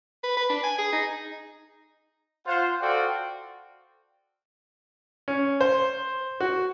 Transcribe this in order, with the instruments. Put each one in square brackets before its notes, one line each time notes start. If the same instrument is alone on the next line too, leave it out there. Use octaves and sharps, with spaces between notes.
[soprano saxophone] B4
B4
D4
G#5
G#4
D#4
[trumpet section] F4 C5 F#5
F#4 A4 C5 D5 F5 G5
[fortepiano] C#4
C5
F#4